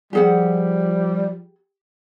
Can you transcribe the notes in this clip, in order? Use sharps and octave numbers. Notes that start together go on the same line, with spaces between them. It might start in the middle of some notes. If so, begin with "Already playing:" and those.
F3 G3 G4 G#4 F#5